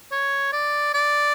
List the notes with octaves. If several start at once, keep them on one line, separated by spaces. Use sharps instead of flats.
C#5
D5
D5